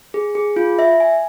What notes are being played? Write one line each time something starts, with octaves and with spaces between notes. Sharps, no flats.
G#4
G#4
F4
E5
G#5